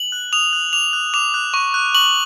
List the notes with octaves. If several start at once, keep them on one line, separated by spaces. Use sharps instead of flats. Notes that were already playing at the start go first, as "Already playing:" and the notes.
Already playing: F#7
F#6
D#6 F7
F#6
D6 F7
F#6
D6 F7
F#6
C#6
F#6
C#6 F#7